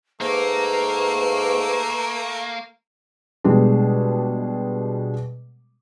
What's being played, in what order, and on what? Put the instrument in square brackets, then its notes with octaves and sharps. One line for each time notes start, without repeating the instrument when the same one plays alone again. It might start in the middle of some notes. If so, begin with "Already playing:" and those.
[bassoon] G#2 [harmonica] A3 [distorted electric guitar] A#3 [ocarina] B4
[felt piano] B2 G3 G#3 D4